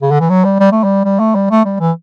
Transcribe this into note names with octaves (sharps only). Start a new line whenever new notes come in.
C#3
D3
E3
F#3
G3
G3
A3
G3
G3
A3
G3
A3
G3
E3